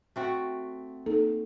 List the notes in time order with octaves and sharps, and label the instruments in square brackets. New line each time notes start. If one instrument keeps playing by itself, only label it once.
[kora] A3 C4 F#4
[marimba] A#3 D#4 A4